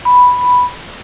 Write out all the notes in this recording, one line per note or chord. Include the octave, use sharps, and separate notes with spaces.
B5